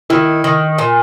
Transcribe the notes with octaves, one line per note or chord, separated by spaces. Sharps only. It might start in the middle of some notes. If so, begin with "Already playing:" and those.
D#3 E4
D#3
A#2